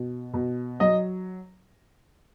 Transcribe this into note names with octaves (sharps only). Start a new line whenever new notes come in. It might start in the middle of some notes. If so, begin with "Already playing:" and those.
Already playing: B2
B2
F#3 D#5